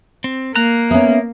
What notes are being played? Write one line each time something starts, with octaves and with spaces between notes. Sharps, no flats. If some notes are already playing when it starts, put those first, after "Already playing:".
C4
A#3 A#5 F#6
B3 C#4 E5